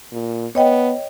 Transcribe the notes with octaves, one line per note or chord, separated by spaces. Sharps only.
A#2
B3 C#5 D#5 G5